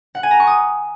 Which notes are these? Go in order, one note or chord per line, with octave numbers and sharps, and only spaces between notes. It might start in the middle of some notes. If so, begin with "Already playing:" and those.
F#5
G#5
A#5
C#6
D#6